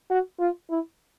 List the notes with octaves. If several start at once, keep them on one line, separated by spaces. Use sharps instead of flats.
F#4
F4
E4